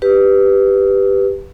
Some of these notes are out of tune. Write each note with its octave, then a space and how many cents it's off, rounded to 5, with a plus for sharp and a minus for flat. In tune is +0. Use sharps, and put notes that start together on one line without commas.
G4 +0 B4 +0